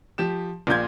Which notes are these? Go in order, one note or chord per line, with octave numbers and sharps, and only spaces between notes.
F3 G4 E7
A#1 A#2 F4 G6 G#6